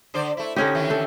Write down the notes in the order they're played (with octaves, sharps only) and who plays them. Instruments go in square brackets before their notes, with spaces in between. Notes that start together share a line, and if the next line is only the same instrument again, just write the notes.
[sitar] D3 C5 D5
A3 E4
[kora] D3 C#4 G4 [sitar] D#4
[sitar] D#3 E3 E4
[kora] A4 G5